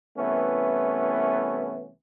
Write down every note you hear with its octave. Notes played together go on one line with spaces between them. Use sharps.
C2 E3 A3 B3 C#4